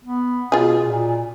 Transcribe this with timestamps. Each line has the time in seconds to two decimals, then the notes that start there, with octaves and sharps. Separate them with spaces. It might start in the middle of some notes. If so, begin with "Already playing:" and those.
0.05 B3
0.52 B2 F4 G#4
0.84 A#2